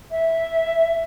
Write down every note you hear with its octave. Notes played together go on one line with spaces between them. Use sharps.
E5